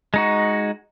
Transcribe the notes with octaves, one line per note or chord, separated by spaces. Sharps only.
G#3 D#4 F#4